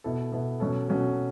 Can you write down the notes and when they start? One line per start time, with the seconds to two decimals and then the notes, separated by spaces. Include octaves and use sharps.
0.04 B2 B3 E4 A4
0.32 B2 B3 E4 A4
0.60 B2 F#3 C#4 F#4 A4
0.88 B2 F#3 C#4 F#4 A4